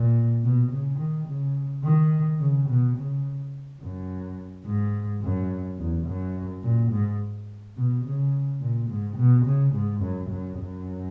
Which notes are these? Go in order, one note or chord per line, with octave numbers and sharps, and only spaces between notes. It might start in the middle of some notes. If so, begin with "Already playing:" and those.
Already playing: A#2
B2
C#3
D#3
C#3
D#3
C#3
B2
C#3
F#2
G#2
F#2
E2
F#2
A#2
G#2
B2
C#3
A#2
G#2
B2
C#3
G#2
F#2
F#2
F#2